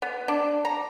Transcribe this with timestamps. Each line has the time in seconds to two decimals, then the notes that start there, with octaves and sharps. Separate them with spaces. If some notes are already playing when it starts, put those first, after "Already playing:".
0.02 B3
0.28 D4
0.65 A#5